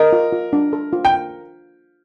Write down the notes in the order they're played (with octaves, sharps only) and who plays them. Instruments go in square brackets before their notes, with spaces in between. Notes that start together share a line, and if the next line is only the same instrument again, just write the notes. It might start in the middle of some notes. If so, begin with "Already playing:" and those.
Already playing: [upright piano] A#4 [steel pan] D#5
[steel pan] F4
F4
D4
A4
F4
[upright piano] G5